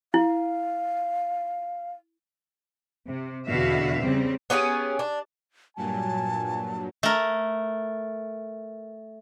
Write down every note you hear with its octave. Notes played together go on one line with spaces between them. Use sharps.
E4 F5
C3
E2 B2 D3 F#4 E5 F5
C#3 G3 C4
B3 C#4 G4 G#4
D4
G2 A#2 F#3 G#5 A5
A3 A#4